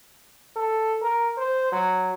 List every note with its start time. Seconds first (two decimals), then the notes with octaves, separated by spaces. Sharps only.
0.56 A4
1.02 A#4
1.38 C5
1.72 F#3